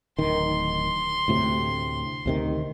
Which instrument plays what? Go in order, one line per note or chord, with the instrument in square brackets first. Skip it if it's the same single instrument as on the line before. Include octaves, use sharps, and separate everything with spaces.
[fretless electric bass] D1 D#3 [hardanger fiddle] C6
[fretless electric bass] D2 A2 C3
D2 C3 D#3